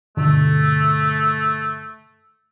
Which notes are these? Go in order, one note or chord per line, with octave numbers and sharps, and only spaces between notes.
G2 B2 D3 A3